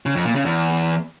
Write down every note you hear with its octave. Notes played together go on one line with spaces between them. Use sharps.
C#3
F2
A#2
C#3
E2